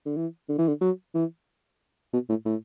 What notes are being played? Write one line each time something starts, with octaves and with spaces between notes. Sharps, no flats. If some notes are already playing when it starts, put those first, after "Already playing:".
D3
E3
D3
E3
D3
F#3
E3
B2
A2
A2